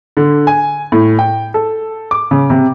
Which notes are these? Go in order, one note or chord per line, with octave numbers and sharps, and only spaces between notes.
D3
G#5
A2
G5
A4
D6
C#3
C3